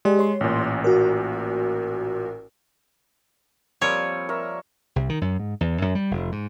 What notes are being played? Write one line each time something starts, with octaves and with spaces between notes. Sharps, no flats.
G#3 G4 D5
C#5 C6
A1 A#2
F#4 A#4
F3 G3 A#3 C4 C#5
A#4 E5 C#6
C2
D#3
F#2
G#2
E2
F#2
G3
F1
G#2